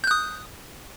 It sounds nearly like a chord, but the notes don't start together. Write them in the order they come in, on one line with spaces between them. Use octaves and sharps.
G6 F#6 D#6